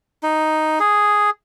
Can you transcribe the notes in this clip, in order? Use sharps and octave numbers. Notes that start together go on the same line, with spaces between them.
D#4
G#4